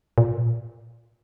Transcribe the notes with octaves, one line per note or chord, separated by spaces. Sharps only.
A#2